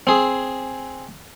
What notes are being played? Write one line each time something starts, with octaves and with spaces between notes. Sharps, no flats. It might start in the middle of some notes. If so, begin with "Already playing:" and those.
C4 G#4